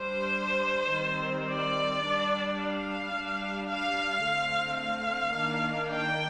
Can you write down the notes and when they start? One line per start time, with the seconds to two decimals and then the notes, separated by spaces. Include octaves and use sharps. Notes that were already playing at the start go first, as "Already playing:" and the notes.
Already playing: G3 D4 C5
0.94 D#3 G3 C4
1.50 D5
2.05 G3 D4
2.60 F5
3.16 G3 D4
3.70 F5
4.25 D3 A3 C4
4.80 F5
5.36 D#3 A#3 D4
5.91 G5